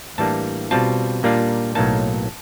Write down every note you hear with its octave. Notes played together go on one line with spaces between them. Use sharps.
A2 E3 G3 A#3 D4 A5
B2 G3 C4 F4 A5
A#2 G3 A#3 D4 F4
B1 A2 F#3 A#3 D#4 A5